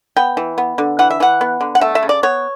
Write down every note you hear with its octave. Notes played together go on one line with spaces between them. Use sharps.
B3 G5
E3
B3
D3
E3 F#5
E5
E3 F#5
B3
D3
F#5
A3 E5
E5
C#3
D5
B3 C#5